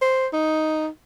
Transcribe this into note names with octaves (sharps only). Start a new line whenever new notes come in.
C5
D#4